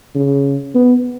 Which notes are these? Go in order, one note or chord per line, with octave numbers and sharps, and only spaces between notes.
C#3
B3